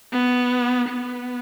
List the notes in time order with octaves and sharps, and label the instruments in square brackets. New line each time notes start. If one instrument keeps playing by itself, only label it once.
[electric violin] B3
B3